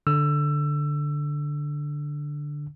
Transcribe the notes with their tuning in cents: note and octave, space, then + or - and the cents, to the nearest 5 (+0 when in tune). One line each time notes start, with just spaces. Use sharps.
D3 +0 E6 +20